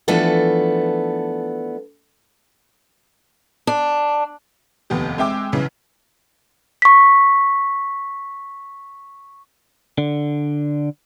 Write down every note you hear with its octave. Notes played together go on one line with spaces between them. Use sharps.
E3 F3 A3 B3 D4 A4
D4
F1 D#2 B3 G4
G#3 C4 E5 G5 D6 E6
B1 C#3 E3
C#6 B6
D3